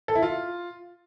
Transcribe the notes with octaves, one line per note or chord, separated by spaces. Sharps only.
A4
E4
F4